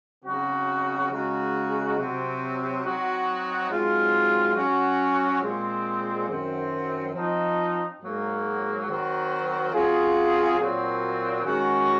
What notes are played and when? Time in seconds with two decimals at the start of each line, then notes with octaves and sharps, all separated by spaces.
0.23 C#3 F#3 C4 D#4 F#4
1.10 C#3 G#3 D#4 F#4
1.97 C3 F#3 C4
2.83 F#3 C4 D#4 F#4
3.69 G#2 F#3 C4 F4
4.55 F#3 C#4 F#4
5.42 A#2 G#3 C4
6.27 F#2 D#3 F#3 C4
7.14 F3 C4 D#4
8.00 G#2 F#3 A#3
8.86 D#3 F#3 C4 F#4
9.72 F#3 C4 F4 G#4
10.58 A#2 F#3 C4
11.45 D#3 G#3 C#4 F#4